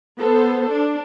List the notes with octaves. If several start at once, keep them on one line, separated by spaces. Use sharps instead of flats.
B3 A4 C5
D4